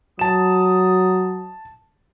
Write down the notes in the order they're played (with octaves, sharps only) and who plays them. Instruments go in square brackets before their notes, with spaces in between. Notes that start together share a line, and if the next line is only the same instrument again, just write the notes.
[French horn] F#3 [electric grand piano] A5 E7 [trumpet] D#6